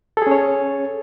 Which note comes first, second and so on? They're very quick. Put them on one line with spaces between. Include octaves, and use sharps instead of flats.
A4 G#4 C#4 C#5